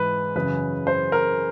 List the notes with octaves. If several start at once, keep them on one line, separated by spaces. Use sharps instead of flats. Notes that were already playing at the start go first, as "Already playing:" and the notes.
Already playing: G#2 E3 B4
F#2 C#3 E3 B4
C5
A#4